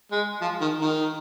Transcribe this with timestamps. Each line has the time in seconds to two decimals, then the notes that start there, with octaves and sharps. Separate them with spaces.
0.12 G#3
0.41 F3
0.61 D#3
0.81 D#3